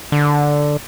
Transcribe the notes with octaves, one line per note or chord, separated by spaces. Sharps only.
D3